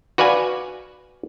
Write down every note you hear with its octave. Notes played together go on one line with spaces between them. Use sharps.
F#4 B4 D5 F5 G#5